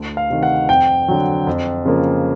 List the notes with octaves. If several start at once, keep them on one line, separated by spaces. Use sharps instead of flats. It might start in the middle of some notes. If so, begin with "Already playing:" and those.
Already playing: D2
F5
C3 D#3
F#5
F2 G5
D3 F#3
F2
C#3 F3 A#3